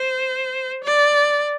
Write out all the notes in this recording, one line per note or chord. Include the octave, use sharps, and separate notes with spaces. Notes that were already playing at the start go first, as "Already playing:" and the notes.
Already playing: C5
D5